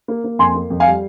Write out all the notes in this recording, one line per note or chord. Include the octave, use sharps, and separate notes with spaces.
A#3
A#3
F2 G#5 C6
A#3
F2
F5 G#5
G3